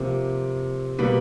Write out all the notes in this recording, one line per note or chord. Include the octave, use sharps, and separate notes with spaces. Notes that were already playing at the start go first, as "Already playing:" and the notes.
Already playing: C3 F3 A#3
B2 G3 A#3 B4